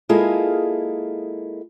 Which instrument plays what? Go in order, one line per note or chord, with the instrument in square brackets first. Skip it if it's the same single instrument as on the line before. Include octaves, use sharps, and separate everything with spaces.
[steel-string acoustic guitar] G#3 A#3 E4 F4 G#4 A4